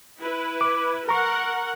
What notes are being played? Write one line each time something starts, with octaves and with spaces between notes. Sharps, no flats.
E4 B4
D6
A#4 F#5 A#5 C#6